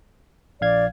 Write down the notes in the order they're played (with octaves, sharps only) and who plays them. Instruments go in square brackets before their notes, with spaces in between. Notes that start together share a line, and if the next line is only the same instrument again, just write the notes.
[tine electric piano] A#1 F5 G#6 [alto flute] D5